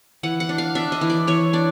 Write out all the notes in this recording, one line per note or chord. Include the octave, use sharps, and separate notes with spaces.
E3 F#5
F#5
D4
F5
D4 E5
D#5
E3
D5
E3 C#5
D4 D5